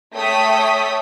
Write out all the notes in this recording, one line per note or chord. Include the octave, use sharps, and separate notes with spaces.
A3 C#5 G5 D#6 B6